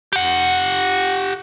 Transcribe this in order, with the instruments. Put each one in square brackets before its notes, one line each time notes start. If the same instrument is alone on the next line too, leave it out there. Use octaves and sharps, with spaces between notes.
[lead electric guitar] G4 F#5